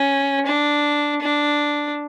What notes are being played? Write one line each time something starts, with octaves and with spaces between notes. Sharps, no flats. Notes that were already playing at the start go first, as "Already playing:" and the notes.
Already playing: C#4
D4
D4